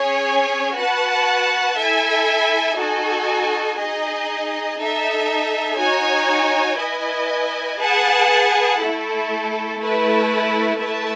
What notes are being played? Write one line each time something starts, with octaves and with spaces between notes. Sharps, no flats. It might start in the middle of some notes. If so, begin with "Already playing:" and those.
Already playing: C#4 G#4 C#5 G#5
F#4 B4 F#5 A5
E4 A4 E5 G#5
D#4 F#4 A4 D#5 G#5
D#4 G#4 D#5
D#4 A4 E5
D#4 F#4 C#5 G#5
E4 B4 D#5 G#5
G#4 B4 F#5 A5
A3 E4 A4
A3 E4 B4
A3 E4 B4 E5 A5